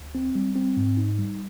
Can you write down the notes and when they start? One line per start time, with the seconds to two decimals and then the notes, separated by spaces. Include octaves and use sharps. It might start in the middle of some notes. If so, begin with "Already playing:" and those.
Already playing: D2
0.15 C4
0.35 G3
0.56 C4
0.77 G#2
0.97 D#4
1.19 G3